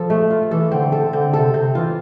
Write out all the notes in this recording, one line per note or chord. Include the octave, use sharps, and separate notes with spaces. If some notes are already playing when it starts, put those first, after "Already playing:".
Already playing: F3 A4
A3
F4
E3 A4
D3 C4
A4
D3 C4
C3 A4
C3 C4
E3 F4